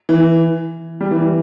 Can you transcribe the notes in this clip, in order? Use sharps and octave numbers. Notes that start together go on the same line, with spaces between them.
E3
G3
E3
G3